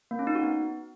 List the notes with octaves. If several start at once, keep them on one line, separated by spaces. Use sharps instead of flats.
A#3
C#4
D#4
F#4
B3